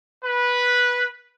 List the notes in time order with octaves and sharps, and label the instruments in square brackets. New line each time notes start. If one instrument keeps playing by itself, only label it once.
[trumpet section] B4